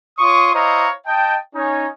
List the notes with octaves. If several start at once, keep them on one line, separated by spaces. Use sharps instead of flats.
F4 C#5 C6 C#6 D#6
E4 C5 C#5 D#5 F5 A#5
D#5 G5 A5
C#4 D#4 C#5